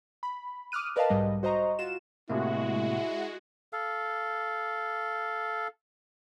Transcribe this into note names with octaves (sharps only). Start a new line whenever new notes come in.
B5
D6 D#6 F6 F#6 D#7
A#4 B4 D5 D#5 F5 A5
B1 G#2 G3 D#5
F#4 C5 D#5 A#5 C#6
F4 F#4 E7
A2 C3 G#3 A#3 E4 F#4
A4 F5